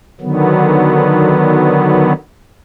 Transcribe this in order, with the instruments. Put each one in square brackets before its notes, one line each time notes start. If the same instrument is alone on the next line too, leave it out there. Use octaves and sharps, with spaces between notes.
[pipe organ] D3 D#3 F#3 B3